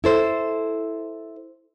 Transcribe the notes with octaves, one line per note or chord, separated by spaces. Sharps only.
E4 A4 C5